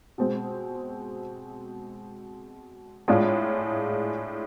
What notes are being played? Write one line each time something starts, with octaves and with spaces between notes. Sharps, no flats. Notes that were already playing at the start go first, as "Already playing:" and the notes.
B2 G#3 C4
A2 G#3 D4 F4 G#4